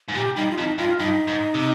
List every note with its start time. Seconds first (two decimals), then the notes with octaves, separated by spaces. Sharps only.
0.09 G#2
0.15 A#2 G4
0.36 G2 D#4
0.51 F4
0.58 F2 D#4
0.78 G2 F4
0.99 G2 D#4
1.28 G#2
1.55 C3